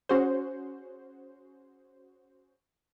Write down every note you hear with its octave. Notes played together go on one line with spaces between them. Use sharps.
C#4 F#4 G#4 C5